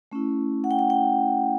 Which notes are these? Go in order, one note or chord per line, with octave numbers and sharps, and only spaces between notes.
A3 C#4 E4
F#5
G5
F#5
G5